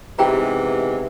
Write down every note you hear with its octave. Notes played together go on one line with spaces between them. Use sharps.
C3 E3 G#3 B3 D#4 G4 G5 A#5